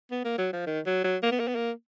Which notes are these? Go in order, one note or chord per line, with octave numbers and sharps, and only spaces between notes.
B3
A#3
F#3
F3
D#3
F#3
F#3
A#3
B3
A#3
B3
A#3